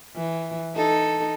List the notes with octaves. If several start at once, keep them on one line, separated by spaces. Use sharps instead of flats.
E3
D#4 A4